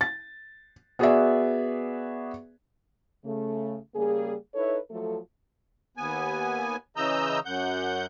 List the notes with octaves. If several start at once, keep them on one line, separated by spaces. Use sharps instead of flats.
A6
B3 F#4 G#4 B4 D5 E5
C#3 A3
C#3 G3 A#3 G#4
D#4 E4 A4 B4 C#5
F3 F#3 A3 A4
D#2 B3 G#5
C#3 E3 D#5 A#5 E6 G6
F#2 F#5 G6